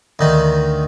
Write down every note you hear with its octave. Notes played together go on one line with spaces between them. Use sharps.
D2 D#3